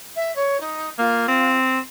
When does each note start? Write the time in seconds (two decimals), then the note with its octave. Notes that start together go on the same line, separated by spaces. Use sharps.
0.16 E5
0.35 C#5
0.60 D#4
0.99 A#3 F4
1.28 C4